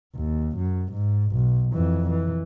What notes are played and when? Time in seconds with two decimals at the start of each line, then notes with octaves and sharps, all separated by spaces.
0.15 D#2
0.57 F#2
0.92 G#2
1.32 B1
1.73 F2 E3
2.10 E3